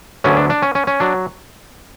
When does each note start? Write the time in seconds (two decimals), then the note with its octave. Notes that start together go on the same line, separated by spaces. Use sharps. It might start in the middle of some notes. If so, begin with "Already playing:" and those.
0.24 D2 D3 F#3 B3 C#4
0.37 D4
0.50 D4
0.62 C#4
0.75 C#4
0.87 C#4
1.00 F#3 D4